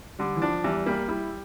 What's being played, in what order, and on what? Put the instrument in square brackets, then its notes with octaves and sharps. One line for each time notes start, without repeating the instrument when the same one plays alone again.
[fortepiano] D3 [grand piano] G3
[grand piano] E3
[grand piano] F3 [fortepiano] D4
[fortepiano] E2 [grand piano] G3
[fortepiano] G3 [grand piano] A#3
[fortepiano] G3 [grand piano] E4